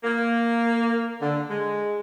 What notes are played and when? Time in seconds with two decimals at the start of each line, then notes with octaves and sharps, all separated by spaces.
0.04 A#3
1.21 D3
1.50 G#3